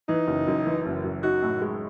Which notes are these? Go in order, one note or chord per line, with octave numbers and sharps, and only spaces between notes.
E3 D#4
F#1
F#2
E3
F#1
F#2
D#4 F#4
A2
G#3